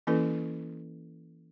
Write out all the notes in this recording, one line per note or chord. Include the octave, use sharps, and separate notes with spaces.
E3 A#3 C#4 E4 A4 B4